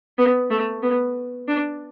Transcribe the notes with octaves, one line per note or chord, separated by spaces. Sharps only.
B3
A3
B3
D4